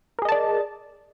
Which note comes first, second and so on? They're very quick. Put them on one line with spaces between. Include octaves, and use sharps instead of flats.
A#4 G#4 D#5 A5 D5